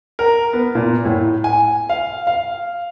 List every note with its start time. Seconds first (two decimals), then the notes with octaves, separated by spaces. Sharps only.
0.19 A#4
0.53 B3
0.75 A#2
1.05 A2
1.44 G#5
1.89 F5
2.27 F5